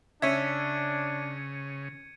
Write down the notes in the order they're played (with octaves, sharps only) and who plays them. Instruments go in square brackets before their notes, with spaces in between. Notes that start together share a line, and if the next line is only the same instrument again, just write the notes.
[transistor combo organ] C#3 [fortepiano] C#4 E5 [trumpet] D4 [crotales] G#6 C#7 D#7